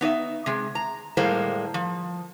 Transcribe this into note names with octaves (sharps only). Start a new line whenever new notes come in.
B3 D#4 D5 E5
C3 G#3
A#5
A2 G3 G#3 A#3 C5
F3